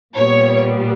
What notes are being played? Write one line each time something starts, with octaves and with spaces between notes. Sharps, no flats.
A#2 G3 B3 C#5